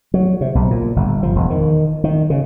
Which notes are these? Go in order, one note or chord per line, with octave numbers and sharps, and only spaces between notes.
F#3
C3
B1
A#2
G1
F3
E1
D#3
D#3
C#3